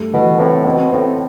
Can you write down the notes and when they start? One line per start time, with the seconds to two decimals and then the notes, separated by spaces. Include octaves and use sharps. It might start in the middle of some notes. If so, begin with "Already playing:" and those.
Already playing: G2 A3
0.13 B2 E3
0.39 A2 C4
0.65 B2 C4
0.92 A2 C4